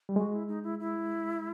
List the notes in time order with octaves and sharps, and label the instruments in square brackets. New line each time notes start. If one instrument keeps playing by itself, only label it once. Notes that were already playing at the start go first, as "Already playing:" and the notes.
[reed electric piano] G3
[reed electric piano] G#3 [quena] F#4
[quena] E4
D#4
E4
E4